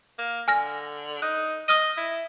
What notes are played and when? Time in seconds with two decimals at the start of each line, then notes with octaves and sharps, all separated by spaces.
0.19 A#3
0.48 D3 G#5 F6 A#6
1.22 D#4 F#6
1.68 D#5 D#6 F6 D#7
1.97 E4